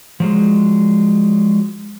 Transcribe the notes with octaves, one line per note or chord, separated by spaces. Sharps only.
F3 F#3 G#3